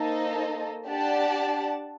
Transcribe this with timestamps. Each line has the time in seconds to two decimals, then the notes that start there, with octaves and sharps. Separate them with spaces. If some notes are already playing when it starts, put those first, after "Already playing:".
Already playing: A#3 D#4 A4 C5 D#5
0.86 D4 G4 D5 F#5 A5